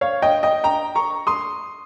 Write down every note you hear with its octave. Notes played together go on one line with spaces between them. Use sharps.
C#5 F5
D#5 G5
D#5 G5
G5 A#5
A#5 C#6
C6 D#6